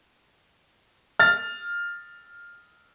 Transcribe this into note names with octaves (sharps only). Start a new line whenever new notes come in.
F6 A6